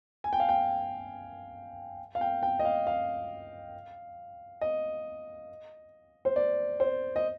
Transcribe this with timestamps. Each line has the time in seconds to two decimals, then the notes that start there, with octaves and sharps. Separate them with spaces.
0.24 G#5
0.33 G5
0.40 F5
0.49 G5
2.15 F5
2.21 G5
2.43 G5
2.59 D#5
2.65 F5
2.87 F5
4.61 D#5
6.25 C5
6.36 D5
6.80 C5
7.16 D#5